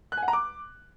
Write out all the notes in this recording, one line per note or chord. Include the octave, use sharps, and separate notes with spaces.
F#6
G#5
F#5
A#5
D6